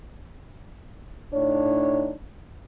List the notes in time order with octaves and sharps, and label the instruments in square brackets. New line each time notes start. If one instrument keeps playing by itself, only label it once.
[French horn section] A2 D4 D#4 C#5